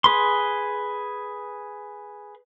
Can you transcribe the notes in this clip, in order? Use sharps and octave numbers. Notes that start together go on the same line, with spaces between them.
G#4 B4 C6